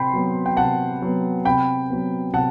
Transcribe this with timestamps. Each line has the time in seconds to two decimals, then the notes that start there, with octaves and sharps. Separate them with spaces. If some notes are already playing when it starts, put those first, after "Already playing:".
Already playing: C3 G5 B5 C6
0.13 F#3 B3
0.46 G5
0.57 C3 F#5 A5
1.02 F#3 B3
1.45 C3 G5 B5
1.90 F#3 B3
2.34 C3 F#5 A5